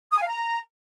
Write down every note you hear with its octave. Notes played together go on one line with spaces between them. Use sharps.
D#6
G#5
F5
A#5